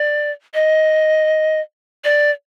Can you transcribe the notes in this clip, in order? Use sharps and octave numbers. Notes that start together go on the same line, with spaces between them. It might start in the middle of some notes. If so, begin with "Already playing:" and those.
Already playing: D5
D#5
D5